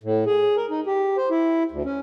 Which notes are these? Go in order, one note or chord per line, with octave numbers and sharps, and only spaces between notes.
A2
G#4
A#4
D#4
G4
C5
E4
D2
C#4